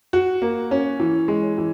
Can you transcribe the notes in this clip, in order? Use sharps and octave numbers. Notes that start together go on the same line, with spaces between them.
F#4
A#3
C#4
E3
G#3
E3